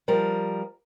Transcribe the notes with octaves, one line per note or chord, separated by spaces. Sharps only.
F3 G3 A#4